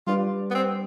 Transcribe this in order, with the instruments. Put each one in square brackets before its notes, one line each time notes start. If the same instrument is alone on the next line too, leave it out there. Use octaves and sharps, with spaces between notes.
[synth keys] G3 D4 G4 B4 D5 [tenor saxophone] F4
[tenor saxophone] B3
C4